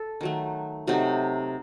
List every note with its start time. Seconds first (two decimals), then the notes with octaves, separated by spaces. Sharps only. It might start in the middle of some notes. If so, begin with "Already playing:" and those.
Already playing: A4
0.21 D#3 F#3 A3
0.87 C3 F#3 A3 D#4